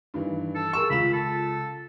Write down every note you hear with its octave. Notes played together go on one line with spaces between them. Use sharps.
G2 D#3 E3
A4
G#4 A#4 C#6 E6
C#2 F4 B5 E7
A4